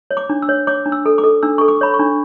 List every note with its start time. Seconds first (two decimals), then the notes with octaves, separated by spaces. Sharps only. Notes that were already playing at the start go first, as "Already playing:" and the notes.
0.11 C#5
0.17 D6
0.30 D4
0.42 E6
0.49 C#5
0.67 C#5 D6
0.86 D4
0.92 E6
1.06 A4
1.18 D6
1.24 A4
1.43 D4 E6
1.58 A4 C#6
1.68 D6
1.81 C#5 B5
1.94 C#6
1.99 D4